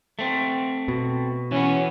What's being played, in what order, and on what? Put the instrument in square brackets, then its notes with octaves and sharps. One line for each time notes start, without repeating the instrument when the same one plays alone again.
[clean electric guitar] A3 C4
[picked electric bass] B2
[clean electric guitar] E3 B3 [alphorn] C#4